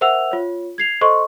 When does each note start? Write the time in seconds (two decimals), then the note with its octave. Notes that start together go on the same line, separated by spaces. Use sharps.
0.01 A#4 C5 E5 F#5 E6 F7
0.31 F4 C#5
0.78 G#6 C7 F7
1.01 A4 C5 D#5 C6 C#6